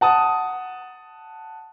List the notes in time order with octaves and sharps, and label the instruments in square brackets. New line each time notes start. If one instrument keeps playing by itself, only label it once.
[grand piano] F#5 A5 D#6